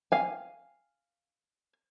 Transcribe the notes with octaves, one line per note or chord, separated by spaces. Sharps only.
F5 G#5